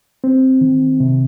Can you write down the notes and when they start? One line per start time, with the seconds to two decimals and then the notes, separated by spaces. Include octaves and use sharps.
0.24 C4
0.61 D#3
1.00 C3